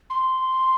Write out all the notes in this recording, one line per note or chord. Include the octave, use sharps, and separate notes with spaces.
C6